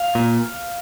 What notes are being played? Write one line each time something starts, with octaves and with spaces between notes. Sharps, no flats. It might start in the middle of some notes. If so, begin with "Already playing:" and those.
Already playing: F5
A#2